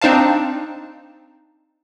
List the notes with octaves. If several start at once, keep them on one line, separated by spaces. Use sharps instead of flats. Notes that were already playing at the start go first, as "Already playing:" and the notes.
C4 D4 D#4 C5 F5 A5